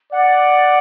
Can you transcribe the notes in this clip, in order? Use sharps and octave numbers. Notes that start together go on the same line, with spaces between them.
D5 F#5